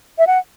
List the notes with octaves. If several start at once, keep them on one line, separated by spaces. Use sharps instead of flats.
E5
F#5